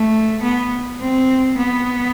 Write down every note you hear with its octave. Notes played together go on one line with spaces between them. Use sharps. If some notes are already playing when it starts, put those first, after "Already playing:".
Already playing: A3
B3
C4
B3